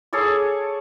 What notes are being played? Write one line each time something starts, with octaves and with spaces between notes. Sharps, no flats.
G#4 A4 C#5 D6